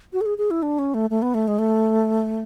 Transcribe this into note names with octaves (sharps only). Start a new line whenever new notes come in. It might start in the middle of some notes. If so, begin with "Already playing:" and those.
F#4
A4
G#4
G#4
E4
D4
C#4
A3
A3
B3
A3
G#3
A3